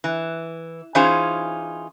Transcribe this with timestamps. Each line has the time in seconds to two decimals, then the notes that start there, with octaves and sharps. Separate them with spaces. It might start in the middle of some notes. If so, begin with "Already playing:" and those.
0.04 E3
0.95 E3 C#4 D#4 F4 G#4 C5